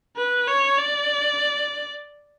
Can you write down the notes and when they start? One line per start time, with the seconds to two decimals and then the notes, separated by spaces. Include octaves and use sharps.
0.17 B4
0.48 C#5
0.78 D5